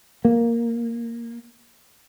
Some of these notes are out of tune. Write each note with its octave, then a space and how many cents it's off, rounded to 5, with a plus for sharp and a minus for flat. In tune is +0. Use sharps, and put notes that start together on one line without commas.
A#3 +0